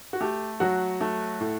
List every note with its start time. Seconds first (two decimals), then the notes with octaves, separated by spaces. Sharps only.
0.13 F#4
0.21 A3 G4
0.60 F#3 F#4
1.01 A3
1.40 A2